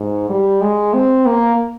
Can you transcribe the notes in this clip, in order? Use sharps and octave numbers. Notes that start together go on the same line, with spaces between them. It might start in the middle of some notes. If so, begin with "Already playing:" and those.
Already playing: G#2
G3
G#3
C4
A#3